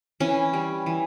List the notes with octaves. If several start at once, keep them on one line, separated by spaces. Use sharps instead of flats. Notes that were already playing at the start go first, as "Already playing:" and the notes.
E3 C#4
G3
E3